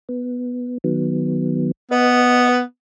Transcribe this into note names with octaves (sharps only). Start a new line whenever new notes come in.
B3
D#3 F#3 B3
B3 B4 D#5